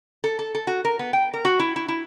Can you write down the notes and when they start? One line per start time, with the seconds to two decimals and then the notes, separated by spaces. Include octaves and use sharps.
0.24 A4
0.39 A4
0.55 A4
0.67 F#4
0.85 A#4
0.99 B3
1.13 G5
1.34 A#4
1.45 F#4
1.60 E4
1.76 E4
1.88 E4